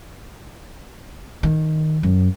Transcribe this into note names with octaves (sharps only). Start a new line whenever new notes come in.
D#3
F#2